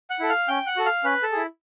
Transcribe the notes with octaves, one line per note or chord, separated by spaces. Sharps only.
F#5 F#6
E4 A4
F5 F6
C#4 G5 G6
F#5 F#6
F#4 A4
F5 F6
C#4 B4 B5
A4 A5
E4 G#4